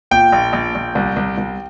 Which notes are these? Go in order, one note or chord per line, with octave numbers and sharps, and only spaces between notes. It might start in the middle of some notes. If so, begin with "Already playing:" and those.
A#2 G5
A#1
A#1
A#1
C2
C2
C2